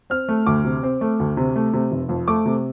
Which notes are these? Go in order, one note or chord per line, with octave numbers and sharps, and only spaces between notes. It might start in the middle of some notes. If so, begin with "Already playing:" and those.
C4 F6
A3
D2 D6
C3
C4
A3
D2
C3
A3
C3
F1
F2
A3 D6
C3